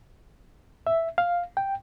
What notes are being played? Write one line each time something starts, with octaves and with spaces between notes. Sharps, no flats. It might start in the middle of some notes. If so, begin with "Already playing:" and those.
E5
F5
G5